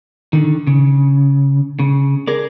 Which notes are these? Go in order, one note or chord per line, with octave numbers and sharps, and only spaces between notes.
D3 D#3
C#3
C#3
G#4 A#4 D5